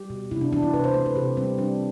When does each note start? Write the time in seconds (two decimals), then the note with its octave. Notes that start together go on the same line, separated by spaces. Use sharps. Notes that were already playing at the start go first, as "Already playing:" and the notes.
Already playing: G3 G4
0.10 B2
0.31 C3 E4
0.41 D4
0.53 E3 D4
0.63 E4
0.73 C3 B4
0.84 C5
0.94 A3 C5
1.06 B4
1.16 C3 G4
1.37 G3 C4
1.58 G3 D4